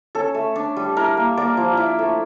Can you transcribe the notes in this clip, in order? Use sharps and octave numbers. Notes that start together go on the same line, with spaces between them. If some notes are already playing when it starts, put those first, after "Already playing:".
C#4 A4
A3
D4
G3
E4 A#4
A#3
A#3 D5
F3
E4
A3